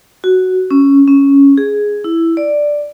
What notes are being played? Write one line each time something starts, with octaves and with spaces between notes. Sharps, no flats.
F#4
C#4
C#4
G#4
E4
D5